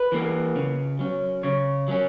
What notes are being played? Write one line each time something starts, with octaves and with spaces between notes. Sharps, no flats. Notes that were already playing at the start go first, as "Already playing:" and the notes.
Already playing: B4
E3 A#3
C#3
F#3 C#4
C#3 C#5
F#3 C#4